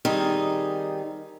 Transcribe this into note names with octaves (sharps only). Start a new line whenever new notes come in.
D#3 G3 C4 D#4 G#4